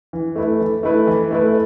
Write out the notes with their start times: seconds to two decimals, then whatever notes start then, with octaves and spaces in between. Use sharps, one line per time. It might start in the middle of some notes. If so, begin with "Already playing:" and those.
0.13 E3
0.36 A3 E4 B4
0.60 E3
0.83 A3 E4 B4
1.07 E3
1.31 A3 E4 B4